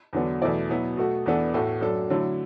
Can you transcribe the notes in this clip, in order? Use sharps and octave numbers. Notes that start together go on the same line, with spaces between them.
E2 D3 F#3 B3 D4
E2 B2 A3 E4 D5
B2 F#3 B3 E4
B2 A3 F#4
E2 E3 B3 D4 A4
A2 A3 F#4
F#2 F#3 D4 A4
D3 F#3 A3 E4